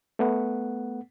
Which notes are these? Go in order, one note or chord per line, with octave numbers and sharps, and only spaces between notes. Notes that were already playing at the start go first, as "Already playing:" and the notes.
A3 B3 F#5